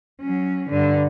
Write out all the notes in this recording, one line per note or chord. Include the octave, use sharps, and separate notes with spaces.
F#3 C#4
G2 D3